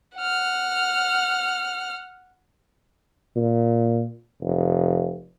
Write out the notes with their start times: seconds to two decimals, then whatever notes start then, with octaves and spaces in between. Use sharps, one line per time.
0.17 F#5 F6
3.36 A#2
4.42 F1